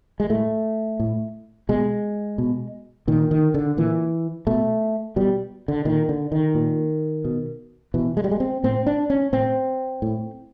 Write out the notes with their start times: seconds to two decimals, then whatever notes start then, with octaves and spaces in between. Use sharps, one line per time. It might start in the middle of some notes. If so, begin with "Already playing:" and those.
0.20 G#3
0.30 A2 A3
1.00 A2
1.69 B2 G#3
2.38 B2
3.08 A#2 D#3
3.31 D#3
3.54 D3
3.77 A#2 E3
4.47 B2 A3
5.16 B2 G3
5.68 D3
5.85 A#2 D#3
6.09 D3
6.32 D#3
6.55 A#2
7.25 B2
7.94 B2 E3
8.17 G#3
8.24 G3
8.31 G#3
8.40 C4
8.64 A2 C4
8.86 D4
9.10 C#4
9.32 A2 C4
10.02 A2